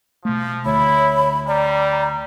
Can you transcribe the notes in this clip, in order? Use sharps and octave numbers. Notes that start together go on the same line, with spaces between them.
B2 F3 A3
D2 E4 C#5 B5
G3 D5 A#5